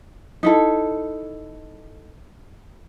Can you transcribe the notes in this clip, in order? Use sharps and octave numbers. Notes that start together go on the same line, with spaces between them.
D#4 E4 A4